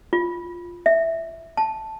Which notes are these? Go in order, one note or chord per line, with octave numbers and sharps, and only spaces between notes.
F4
E5
A5